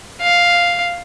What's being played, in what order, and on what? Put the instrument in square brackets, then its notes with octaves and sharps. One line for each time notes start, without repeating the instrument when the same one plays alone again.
[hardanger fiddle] F5